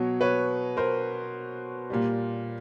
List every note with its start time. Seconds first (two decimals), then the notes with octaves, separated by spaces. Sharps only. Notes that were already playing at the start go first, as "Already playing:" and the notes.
Already playing: B2 F#3 C#5
0.21 B4 C#5
0.77 A#4 C5
1.90 A#2 G3